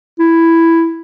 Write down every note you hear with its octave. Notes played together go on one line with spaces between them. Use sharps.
E4